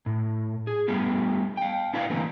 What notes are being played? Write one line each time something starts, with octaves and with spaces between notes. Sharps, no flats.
A2
G#4
G3 A3 B3 F4
F5 G5
D4 E4 F#4 B4 D5 F5
D3 E3 F#3 A3 A#3 C4